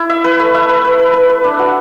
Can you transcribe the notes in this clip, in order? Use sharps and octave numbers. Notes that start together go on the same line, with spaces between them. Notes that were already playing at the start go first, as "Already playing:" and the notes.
Already playing: E4
E5
B4
A3
E5
B4
B4
B4
B4
B4
D4
F#4